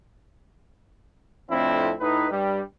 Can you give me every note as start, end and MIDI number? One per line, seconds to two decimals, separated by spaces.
1.50 1.93 41
1.50 1.93 45
1.50 1.93 53
1.50 1.93 60
1.50 1.93 62
1.50 1.93 64
2.00 2.27 45
2.00 2.27 63
2.00 2.27 64
2.00 2.27 71
2.30 2.60 43
2.30 2.60 55